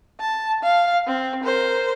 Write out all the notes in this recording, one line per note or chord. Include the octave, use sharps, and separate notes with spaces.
A5
F5
C4
A#4 C5